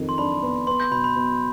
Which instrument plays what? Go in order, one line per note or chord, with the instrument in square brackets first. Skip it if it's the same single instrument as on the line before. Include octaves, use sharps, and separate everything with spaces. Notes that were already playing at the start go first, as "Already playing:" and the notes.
Already playing: [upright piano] F2 D#3
[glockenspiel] C6
[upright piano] D4 [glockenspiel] B5
[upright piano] B3
[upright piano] B3 [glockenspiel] C6
[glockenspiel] G6
[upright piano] B2 [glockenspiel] B5
[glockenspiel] B5
[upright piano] B2